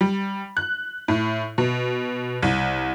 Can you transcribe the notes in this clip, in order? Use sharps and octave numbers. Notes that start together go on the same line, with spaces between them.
G3
F#6
A2
B2
C2